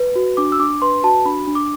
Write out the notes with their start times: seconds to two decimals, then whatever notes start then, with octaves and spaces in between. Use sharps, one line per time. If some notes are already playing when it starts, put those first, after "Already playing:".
Already playing: B4
0.16 F#4
0.37 D4 D6
0.52 E6
0.59 D4 D6
0.82 B4 C6
1.04 F#4 A5
1.25 D4 B5
1.47 D4
1.55 D6